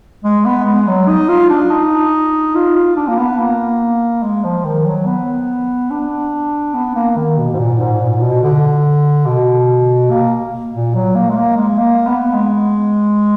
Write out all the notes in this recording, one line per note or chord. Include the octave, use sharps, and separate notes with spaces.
G#3
B3
G#3
F#3
D#4
F4
D4
D#4
F4
F4
D4
A#3
B3
A#3
G#3
F3
D#3
F#3
B3
D4
B3
A#3
D#3
B2
G#2
A#2
G#2
A#2
B2
D3
B2
A#3
A#2
F#3
A#3
G#3
A#3
G#3
A#3
B3
G#3